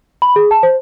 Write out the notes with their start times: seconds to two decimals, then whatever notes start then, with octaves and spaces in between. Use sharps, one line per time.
0.22 B5
0.36 G#4
0.51 A5
0.63 C5